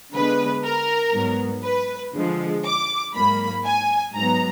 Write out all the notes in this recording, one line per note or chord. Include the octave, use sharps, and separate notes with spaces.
D3 G#3 B3 B4
A#4
G#2 F#3 B3
B4
D3 F3 G#3
D6
G#2 F#3 A#3 B5
G#5
G#2 F#3 B3 A#5